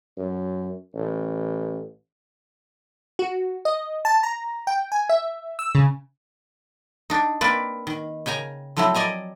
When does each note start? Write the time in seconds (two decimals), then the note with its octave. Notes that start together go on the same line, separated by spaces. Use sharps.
0.17 F#2
0.95 A1
3.19 F#4
3.65 D#5
4.05 A5
4.23 A#5
4.67 G5
4.92 G#5
5.09 E5
5.59 E6
5.75 C#3
7.10 D4 D#4
7.41 A#3 C4 B4 D5
7.87 D#3
8.26 C#3 G5 G#5 A#5
8.77 F3 F#3 A3 C4 E4
8.94 D5 D#5 G#5 A#5